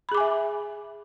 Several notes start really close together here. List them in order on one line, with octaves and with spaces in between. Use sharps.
B5 G#4 D6 G#5 E5